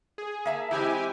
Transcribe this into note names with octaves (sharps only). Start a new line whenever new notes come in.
G#4
A#3 E5 A5
E3 G#3 C4 E4 G4 G#5